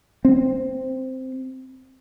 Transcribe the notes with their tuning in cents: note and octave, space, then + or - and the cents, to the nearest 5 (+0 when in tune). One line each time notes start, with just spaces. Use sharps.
C4 -5